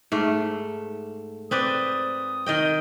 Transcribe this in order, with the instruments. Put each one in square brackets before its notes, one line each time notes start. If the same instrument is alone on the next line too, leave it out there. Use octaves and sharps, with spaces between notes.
[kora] G#2 A3
[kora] C4 B4 D5 [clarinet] D#6
[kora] D#3 D#5 G5